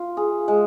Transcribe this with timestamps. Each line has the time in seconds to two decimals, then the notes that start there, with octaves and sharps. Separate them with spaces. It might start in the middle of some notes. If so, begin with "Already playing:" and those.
Already playing: F4
0.17 G#4
0.48 G#3